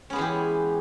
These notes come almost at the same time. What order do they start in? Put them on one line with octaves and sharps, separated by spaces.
C#4 B3 G#3 E3 G4